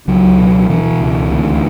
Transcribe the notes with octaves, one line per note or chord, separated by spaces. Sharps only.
C#2 F#3
B2
B2 E3
C#2
D2